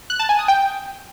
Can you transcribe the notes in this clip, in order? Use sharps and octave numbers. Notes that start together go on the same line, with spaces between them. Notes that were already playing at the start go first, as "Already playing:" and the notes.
F#6
A5
G#5
D#6
G5